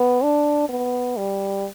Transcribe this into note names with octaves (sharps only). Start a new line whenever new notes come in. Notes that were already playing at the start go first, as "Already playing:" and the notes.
Already playing: B3
D4
B3
G3